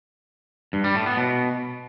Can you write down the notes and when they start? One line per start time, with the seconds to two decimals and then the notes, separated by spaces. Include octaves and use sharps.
0.73 G2
0.84 G3
0.95 A2
1.06 B3
1.17 B2